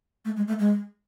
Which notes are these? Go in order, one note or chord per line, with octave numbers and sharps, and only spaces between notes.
A3
G#3
A3
G#3